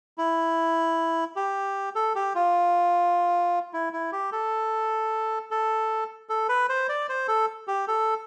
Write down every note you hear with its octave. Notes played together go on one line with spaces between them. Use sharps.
E4
G4
A4
G4
F4
E4
E4
G4
A4
A4
A4
B4
C5
D5
C5
A4
G4
A4